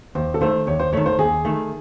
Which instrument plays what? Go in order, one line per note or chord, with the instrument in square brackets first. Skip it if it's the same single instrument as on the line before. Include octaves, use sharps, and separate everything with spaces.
[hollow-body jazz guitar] D#2 [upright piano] C5
[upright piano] A4
[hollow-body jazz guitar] D#3 A3 [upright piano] C5
[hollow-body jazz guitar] D#2 [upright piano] C#5
[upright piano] C5
[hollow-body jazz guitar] D#3 A3 [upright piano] C#5
[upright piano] C5
[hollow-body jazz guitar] D#2 [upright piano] G#4
[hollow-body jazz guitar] D#3 A3